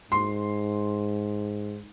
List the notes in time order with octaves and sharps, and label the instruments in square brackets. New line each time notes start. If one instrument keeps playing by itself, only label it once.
[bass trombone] G#2 [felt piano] C6